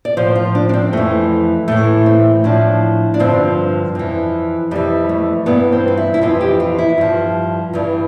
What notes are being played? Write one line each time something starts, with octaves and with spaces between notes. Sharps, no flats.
D5
A2 F3 C5
F4
D4
D4
C4
F2 E3 A3
A2 E3 A3
C4
A2 F3 D4
D4
G2 D3 F3 C4
F2 E3
F2 E3 G3
A3
G2 E3 B3
C4
F4
E4
E4
F2 E3 F4
G4
F4
E4
G2 F3
G2 E3